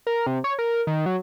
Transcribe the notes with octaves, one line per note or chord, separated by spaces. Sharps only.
A#4
C3
C#5
A#4
D#3
F#3